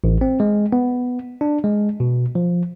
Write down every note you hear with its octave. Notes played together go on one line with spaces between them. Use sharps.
A1
C4
G#3
B3
D4
G#3
B2
F3